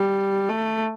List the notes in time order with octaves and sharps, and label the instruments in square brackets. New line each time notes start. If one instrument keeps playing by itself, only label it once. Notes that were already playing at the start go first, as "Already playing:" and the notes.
Already playing: [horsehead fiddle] G3
A3